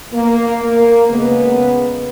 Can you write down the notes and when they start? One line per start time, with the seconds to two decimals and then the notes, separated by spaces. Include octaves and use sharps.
0.13 A#3
0.61 A#3
1.08 C#3 G#3 B3